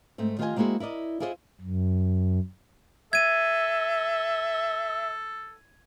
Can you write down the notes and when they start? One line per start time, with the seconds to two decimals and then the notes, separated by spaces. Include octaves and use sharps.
0.18 G#2 A3 C4
0.39 D#3 F4 G4 A#4 D#5 G#5
0.56 G#3 A#3 C4 E4 F#4 G#4
0.80 E4 A#4 D5 D#5
1.20 E4 F4 G#4 C5 C#5 D#5
1.61 F#2
3.13 A4 E5 G#6 D#7